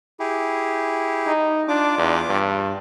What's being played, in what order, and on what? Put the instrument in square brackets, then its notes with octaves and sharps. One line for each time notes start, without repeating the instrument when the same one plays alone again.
[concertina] E4 G4 G#4
[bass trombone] D#4
[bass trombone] D4 [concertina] F4 D6
[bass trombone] E2
G2